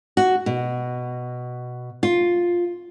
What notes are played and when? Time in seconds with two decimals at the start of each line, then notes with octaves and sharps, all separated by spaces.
0.17 F#4
0.46 B2
2.03 F4